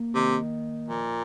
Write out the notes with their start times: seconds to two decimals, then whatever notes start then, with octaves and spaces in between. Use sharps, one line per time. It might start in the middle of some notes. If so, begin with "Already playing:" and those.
Already playing: A#3
0.15 C3 D#3
0.88 A#2 F3